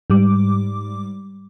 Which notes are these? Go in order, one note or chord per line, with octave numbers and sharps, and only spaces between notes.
G#2 G3 D6